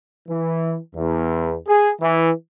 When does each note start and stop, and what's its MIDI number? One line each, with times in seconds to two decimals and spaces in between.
0.29 0.77 52
0.96 1.55 40
1.68 1.91 68
2.00 2.31 52